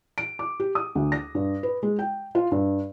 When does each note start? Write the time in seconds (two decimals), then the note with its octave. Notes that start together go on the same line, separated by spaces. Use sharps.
0.18 D7
0.39 D6
0.60 G4
0.75 D#6
0.95 D2
1.12 A#6
1.35 G2
1.63 B4
1.83 G#3
1.99 G5
2.35 F4
2.52 G2